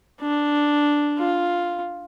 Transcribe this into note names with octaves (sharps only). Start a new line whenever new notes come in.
D4
F4